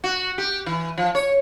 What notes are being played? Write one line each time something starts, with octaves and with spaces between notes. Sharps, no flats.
F#4
G4
E3
F3
C#5